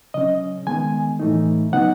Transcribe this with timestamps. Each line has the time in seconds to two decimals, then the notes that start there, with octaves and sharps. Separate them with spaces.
0.14 C#3 F#3 C#4 D#5
0.67 D#3 G#3 B3 G#5
1.19 A2 E3 A3 D#4
1.72 C#3 F#3 B3 D#4 F#5